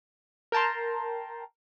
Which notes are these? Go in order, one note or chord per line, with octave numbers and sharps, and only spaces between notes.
A#4 G5 A5 A#5 C6